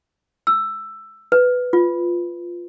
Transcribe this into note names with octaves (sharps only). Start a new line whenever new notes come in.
E6
B4
F4